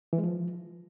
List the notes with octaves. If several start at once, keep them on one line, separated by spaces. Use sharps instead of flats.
E3
G#3
F3